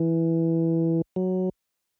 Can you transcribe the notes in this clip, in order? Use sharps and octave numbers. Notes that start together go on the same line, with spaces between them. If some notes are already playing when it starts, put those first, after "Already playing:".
Already playing: E3
F#3